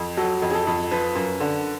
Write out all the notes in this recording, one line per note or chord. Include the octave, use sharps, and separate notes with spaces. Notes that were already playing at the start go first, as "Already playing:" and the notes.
Already playing: F2
F#3 A4
F2
G#4
A4
F2
F3 B4
F#2
D3